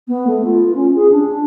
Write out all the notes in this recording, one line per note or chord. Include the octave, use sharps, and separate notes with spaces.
B3
A3
F4
C#4
G#4
D4